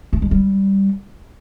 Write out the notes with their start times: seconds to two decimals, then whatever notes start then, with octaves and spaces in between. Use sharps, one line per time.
0.13 A3
0.22 G#3
0.31 G3